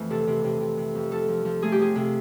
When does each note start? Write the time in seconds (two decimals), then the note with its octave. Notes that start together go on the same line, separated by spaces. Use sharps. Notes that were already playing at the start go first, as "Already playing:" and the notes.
Already playing: F2 E3 A3
0.10 C3 A4
0.27 C3
0.44 C3
0.60 C3
0.77 C3
0.95 F2
1.11 F3 A4
1.28 F3
1.45 F3
1.62 A3 G#4
1.72 G4
1.79 F3 G#4
1.95 C3